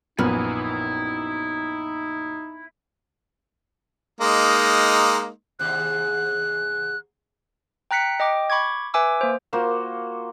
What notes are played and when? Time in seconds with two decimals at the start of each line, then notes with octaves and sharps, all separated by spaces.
0.19 A#1 F#2 B3 D#4 E4 G#5 F6
4.21 G#3 A#3 D#4
5.59 D#2 G#2 C3 F#6
7.91 G5 A#5 F#6 B6 C#7
8.20 D#5 G5 D6
8.50 B5 C#6 D6 G#6
8.94 B4 E5 G#5 D6 E6
9.21 A#3 C5
9.53 A#3 F4 F#4 C5